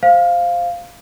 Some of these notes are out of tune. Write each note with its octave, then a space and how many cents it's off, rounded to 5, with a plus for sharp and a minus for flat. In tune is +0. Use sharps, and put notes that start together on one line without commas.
C5 +0 F5 +0